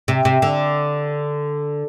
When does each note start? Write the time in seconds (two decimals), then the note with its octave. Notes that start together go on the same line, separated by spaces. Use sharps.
0.08 C3
0.25 C3
0.42 D3